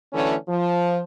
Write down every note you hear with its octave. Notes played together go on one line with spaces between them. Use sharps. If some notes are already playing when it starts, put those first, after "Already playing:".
D3 E3 F#3 A3 C#4
F3